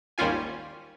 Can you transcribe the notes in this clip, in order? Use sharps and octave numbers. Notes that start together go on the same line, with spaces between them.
G#1 D#2 G3 C#4 F4 G#5